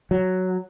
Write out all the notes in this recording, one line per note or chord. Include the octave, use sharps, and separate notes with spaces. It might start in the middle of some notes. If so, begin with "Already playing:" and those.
F#3